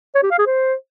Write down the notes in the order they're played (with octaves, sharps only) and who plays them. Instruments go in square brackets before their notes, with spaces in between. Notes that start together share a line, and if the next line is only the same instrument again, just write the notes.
[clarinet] C#5
G4
F5
G#4
C5